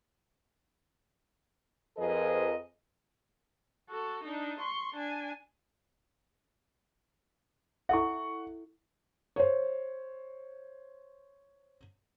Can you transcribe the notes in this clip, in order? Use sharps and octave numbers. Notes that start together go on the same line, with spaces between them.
F2 F3 G#4 A#4 B4 D#5
F#4 A4
D4 D#4
C6 C#6
D4 G#5
E4 A4 E5 F#5 C#6
C5 C#5